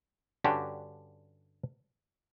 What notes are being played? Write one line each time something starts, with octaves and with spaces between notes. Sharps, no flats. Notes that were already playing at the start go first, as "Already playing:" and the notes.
G2 D3 C#4 D4 F#4 G4